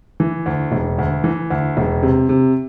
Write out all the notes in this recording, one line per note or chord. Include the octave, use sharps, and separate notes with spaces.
E3
D2
E1
D2
E3
D2
E1
C3
C3